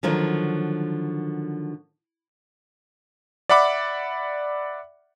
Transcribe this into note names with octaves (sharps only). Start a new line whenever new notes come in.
D3 D#3 F3 F#3
D5 E5 F#5 B5 D6